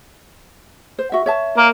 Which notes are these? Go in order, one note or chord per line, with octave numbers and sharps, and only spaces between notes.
C5
F#4 E5
C#5 E5 A5
A#3